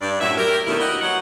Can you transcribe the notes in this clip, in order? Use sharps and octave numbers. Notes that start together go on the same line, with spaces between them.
G2 D5
F#2 A2 F#3 E5
G4 A#4
D#2 B2 D#3 A3 D4 E4
E4 F#4 G4 A#4 D#5
F#3 F#5